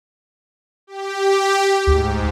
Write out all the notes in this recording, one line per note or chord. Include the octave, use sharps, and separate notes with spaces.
G4
D2 G#2